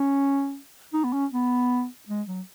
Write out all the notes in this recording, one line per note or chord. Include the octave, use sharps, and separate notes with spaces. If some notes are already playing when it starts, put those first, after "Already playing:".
Already playing: C#4
D#4
B3
C#4
B3
G#3
F#3